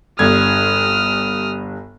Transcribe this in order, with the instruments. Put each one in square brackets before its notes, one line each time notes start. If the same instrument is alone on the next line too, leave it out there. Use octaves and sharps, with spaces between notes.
[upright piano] G1 G2 G#6 [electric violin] D#6 F6